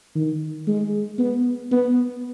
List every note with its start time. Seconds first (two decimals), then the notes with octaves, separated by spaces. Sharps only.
0.16 D#3
0.67 G#3
1.19 B3
1.71 B3